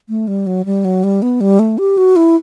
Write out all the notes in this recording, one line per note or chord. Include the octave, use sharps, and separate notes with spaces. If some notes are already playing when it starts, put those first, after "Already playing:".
A3
G3
F#3
G3
F#3
G3
B3
G3
A3
G4
F#4
E4